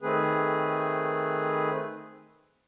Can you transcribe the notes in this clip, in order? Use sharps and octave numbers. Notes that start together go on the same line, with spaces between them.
D#3 A3 C4 G#4 B4